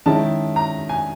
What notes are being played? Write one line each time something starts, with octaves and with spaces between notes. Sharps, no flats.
D#3 G#3 C#4 E4 A5
A#5
G#5